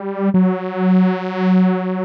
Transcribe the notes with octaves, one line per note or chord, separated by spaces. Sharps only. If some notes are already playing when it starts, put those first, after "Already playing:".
Already playing: G3
F#3